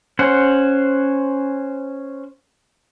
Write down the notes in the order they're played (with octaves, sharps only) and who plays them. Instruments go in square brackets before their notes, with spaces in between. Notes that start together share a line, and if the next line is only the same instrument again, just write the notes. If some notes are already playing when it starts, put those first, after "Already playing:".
[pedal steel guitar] C#4 C5 F#5